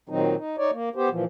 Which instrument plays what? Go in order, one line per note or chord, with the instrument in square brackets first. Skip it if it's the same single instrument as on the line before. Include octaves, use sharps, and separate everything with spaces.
[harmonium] A#2 D#3 F#3 C4 D#4
D#4
D#4 C#5 D5
A#3
B3 G4 C5
A#2 E3 F3